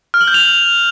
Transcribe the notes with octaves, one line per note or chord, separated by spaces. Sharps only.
F6
F#7
G6
F7